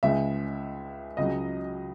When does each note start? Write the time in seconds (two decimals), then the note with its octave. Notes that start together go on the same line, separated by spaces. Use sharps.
0.03 C#2 C#3 G#3 E5
1.17 C#2 C#3 F#3 D#5